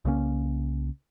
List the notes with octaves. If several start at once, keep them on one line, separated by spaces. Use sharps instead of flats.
C2 C#3 A#3 C#4